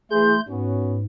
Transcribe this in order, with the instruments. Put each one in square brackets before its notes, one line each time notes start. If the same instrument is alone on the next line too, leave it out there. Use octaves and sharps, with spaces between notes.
[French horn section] E3 G#4 [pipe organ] A3 C6 G6
[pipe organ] G#2 [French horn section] B3 C#4 F#4